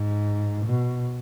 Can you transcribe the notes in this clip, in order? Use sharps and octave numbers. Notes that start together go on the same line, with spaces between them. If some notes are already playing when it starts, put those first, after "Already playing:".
Already playing: G#2
B2